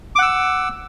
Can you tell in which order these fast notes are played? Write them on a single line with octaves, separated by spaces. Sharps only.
D6 F#5 E6